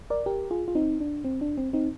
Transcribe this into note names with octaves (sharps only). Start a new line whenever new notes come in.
A#4 D5
G4 A#4
F4 G#4
F4
C4 D#4
D4
C4
D4
C4
C4 D#4